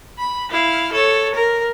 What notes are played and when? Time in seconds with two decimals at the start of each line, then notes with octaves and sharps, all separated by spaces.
0.19 B5
0.51 E4 F5
0.92 A4 C#5
1.34 A#4